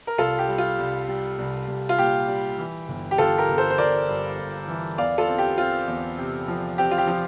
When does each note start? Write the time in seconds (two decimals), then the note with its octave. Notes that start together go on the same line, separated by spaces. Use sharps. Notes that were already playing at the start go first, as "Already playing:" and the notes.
0.07 A#4
0.18 C2 F4 A4
0.39 G4
0.48 G3
0.58 F4
0.78 C2
1.08 G3
1.38 C2
1.68 C2
1.89 F4
1.98 A#2 G4
2.28 G3
2.58 E3
2.88 G1
3.11 G4
3.18 G1 F4 A4
3.38 G4 A#4
3.48 G1
3.58 A4 C5
3.70 C5
3.78 G1 A#4 D5
4.08 G2
4.39 G2
4.68 E3
4.98 E2 D5 F5
5.18 F4 A4
5.28 C4
5.38 G4
5.58 C4 F4
5.88 E2
6.18 C3
6.48 F3
6.78 C4 G4
6.91 F4
6.98 G4
7.07 F3